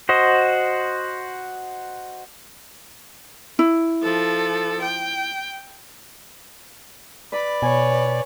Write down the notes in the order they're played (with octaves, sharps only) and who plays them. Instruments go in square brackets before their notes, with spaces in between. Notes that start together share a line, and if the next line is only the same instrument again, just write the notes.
[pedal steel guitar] F#4 C5 D#5
[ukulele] E4
[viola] F3 A4
G5
[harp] B4 B5 [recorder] D5
[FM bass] B2 [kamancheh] B4 C#5 [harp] G#5